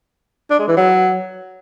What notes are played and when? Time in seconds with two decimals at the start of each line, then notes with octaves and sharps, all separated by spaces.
0.51 D4
0.59 G#3
0.68 E3
0.77 F#3